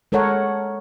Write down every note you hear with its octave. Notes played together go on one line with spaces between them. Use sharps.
G#3 A4 A#4 C#5 F#5